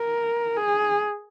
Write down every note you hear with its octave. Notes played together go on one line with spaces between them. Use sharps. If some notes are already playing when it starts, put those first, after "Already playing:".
Already playing: A#4
G#4